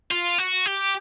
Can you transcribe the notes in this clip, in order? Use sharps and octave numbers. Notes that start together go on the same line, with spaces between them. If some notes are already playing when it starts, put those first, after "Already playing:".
F4
F#4
G4